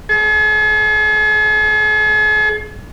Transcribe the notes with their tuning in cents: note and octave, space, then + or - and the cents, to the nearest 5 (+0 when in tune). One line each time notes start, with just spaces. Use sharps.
G#4 +45